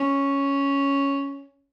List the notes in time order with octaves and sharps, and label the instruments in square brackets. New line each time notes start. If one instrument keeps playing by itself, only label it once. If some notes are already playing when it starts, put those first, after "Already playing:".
Already playing: [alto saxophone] C#4